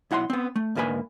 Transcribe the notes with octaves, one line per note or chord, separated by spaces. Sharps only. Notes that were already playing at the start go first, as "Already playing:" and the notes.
B1 E4 F#5 G5 C6
B3 C4
A3
D2 G#2 A#3 G#4 B4 G#5